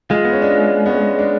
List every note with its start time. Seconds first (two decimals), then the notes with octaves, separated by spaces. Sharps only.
0.10 G#3 F4
0.24 B3
0.33 C#4
0.42 D4
0.50 F4
0.86 B3
0.90 C#4
1.19 D4